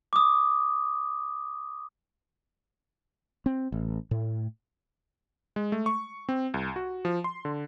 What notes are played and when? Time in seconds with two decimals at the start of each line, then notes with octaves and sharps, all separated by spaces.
0.13 D6 D#6
3.46 C4
3.72 A1
4.11 A2
5.56 G#3
5.72 A3
5.86 C#6
6.29 C4
6.54 C2
6.76 F#4
7.05 F3
7.24 C6
7.45 D3